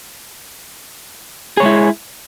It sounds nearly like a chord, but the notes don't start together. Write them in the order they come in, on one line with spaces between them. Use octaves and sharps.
G#4 C#5 G#3 E4